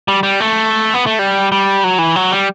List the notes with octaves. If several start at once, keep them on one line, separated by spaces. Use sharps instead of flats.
G3
G3
A3
B3
A3
G3
G3
F#3
E3
F#3
G3